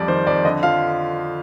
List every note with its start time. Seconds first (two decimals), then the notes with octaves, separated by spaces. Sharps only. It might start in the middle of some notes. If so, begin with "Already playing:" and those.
Already playing: F2 G3 D5
0.08 D#3 C5
0.26 F2 D5
0.45 D3 D#5
0.63 F3 F5